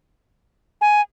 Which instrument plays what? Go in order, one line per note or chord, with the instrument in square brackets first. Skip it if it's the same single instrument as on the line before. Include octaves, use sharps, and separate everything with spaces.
[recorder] G#5